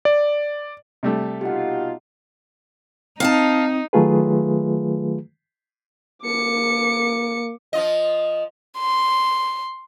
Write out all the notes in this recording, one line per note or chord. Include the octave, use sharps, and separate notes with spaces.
D5
C3 G3 A3
B2 D#4 F4 G4 F#5
C4 D#4 F5 F#5 A5
D#3 F#3 A3 F4 G#4 B4
A#3 D6 C#7
F3 F4 D#5
C6